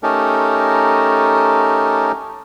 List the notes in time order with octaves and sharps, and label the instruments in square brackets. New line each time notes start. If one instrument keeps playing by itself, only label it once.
[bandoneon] A3 C#4 D#4 G4 A4 A#4